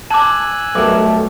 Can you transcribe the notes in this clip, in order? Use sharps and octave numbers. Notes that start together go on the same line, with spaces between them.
G#5 A5 D6 E6 F#6
B1 G2 A3 A#4 D6